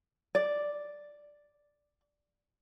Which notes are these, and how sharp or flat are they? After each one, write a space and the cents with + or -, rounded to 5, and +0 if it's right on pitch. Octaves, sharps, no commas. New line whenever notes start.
D5 +0